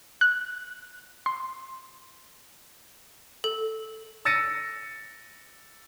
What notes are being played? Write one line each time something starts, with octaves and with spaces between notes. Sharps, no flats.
F#6
C6
A4
E6 A6 A#6 C#7 D#7